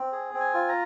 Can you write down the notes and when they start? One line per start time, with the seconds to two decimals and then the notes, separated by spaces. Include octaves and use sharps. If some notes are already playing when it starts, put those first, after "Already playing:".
Already playing: C4
0.12 G#4
0.34 C4
0.40 G#5
0.54 F4
0.69 A#5